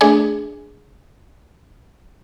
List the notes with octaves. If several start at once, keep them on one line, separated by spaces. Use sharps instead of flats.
A3 D4 G#4